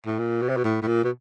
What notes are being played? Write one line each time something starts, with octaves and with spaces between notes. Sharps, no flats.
A2
A#2
B2
C3
B2
A2
A2
A#2
B2